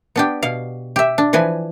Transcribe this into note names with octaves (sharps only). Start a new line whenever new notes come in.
B3 D4 G4
B2 F5
G4 E5
D4
E3 F3 B4 G#5